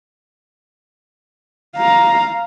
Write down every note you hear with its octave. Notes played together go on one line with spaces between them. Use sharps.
F5 A#5